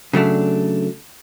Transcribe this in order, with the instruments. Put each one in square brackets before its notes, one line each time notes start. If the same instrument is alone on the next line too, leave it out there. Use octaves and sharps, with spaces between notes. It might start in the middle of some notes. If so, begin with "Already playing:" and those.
[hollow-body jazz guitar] C#3 F#3 A3 D4